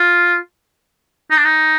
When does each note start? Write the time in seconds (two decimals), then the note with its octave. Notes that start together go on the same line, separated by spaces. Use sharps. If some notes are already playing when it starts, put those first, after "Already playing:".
Already playing: F4
1.31 D#4
1.37 D4
1.45 D#4